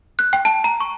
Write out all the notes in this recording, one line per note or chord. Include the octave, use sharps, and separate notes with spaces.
F#6
G5
A5
A#5
C#6